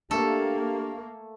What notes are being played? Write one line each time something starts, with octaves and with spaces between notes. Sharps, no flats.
A3 A#3 D4 G4 A4